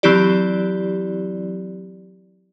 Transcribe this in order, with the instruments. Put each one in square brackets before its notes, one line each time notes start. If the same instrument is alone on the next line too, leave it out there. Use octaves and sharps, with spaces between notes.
[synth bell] E3 F#3 C4 E4 G4 D5